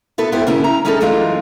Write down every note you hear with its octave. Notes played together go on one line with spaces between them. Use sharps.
B3 E4 A4 B4
G#2 B3 C4 E4 G4 C5
C#3 A#3 C#4 E4
C#4 A#5
G3 C#4 D#4 E4 G#4 A4
F#2 E3 G#3 A3 D#4 F4